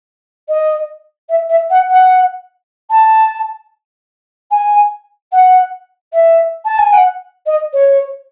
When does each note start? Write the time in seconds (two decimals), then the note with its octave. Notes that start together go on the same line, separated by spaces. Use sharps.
0.48 D#5
1.29 E5
1.49 E5
1.70 F#5
1.89 F#5
2.90 A5
4.51 G#5
5.32 F#5
6.12 E5
6.65 A5
6.78 G#5
6.92 F#5
7.46 D#5
7.73 C#5